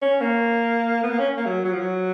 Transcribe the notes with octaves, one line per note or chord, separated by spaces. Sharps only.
C#4
A#3
B3
A#3
C#4
A#3
F#3
F#3
F3
F#3